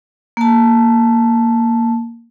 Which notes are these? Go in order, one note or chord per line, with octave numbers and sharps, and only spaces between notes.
A#3 A5